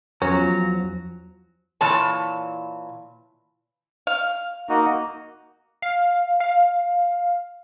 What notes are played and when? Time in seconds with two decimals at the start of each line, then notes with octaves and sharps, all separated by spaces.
0.22 E2 F3 F#3 C#4 A#5
1.81 A#2 E3 C#5 A5
4.07 F5
4.69 A#3 D#4 F#4
5.82 F5
6.40 F5